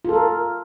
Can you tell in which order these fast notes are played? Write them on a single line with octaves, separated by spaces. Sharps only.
F4 A4 A#4